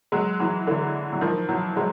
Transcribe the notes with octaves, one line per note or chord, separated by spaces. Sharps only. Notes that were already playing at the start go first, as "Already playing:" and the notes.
F#3 G#3
E3 F#3
D3 E3
F#3
D#3 F3
E3 F#3
F#3 G#3